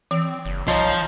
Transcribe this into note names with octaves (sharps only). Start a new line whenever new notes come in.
E3 C4
F#1
C2 F3 D#4 F4 C#5 D#5